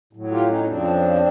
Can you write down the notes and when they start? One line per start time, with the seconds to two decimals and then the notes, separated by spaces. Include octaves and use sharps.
0.13 A2 F#3
0.31 F4 G4
0.49 C#4 D#4
0.63 C#4
0.67 F2 C#3 F3 C4 D4